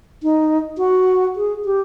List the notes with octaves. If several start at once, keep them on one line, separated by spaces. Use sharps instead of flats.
D#4
F#4
G#4
G4